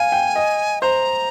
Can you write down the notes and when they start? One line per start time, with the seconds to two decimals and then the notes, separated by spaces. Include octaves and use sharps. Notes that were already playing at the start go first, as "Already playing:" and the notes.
Already playing: F5 G#5
0.12 G5
0.36 D#5
0.81 C5 A#5